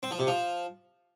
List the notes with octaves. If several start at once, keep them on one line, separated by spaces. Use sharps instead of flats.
C4
F3
C3
F3